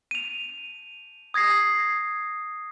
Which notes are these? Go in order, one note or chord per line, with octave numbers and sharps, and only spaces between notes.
D#7 F7
D#6 G#6 A#6 C7